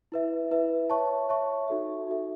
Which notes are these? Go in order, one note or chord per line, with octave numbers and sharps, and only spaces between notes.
E4 B4 E5
E4 B4 E5
C#5 E5 A5 C#6
C#5 E5 A5 C#6
D#4 F#4 A4 E5
D#4 F#4 A4 E5